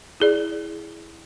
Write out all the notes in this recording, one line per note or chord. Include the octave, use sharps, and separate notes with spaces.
E4 G#4 D5